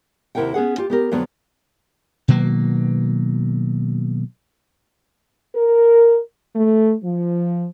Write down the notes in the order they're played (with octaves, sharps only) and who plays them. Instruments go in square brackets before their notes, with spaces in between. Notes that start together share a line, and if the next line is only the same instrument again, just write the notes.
[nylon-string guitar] D#2 C3 E4 A#4 F#5 G5
B3 C#4 G#4 F#5
F4 G4
B3 G4 A#4
F2 D3 F#3 B3
[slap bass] B2 D#3 F#3 A#3
[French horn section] A#4
A3
F3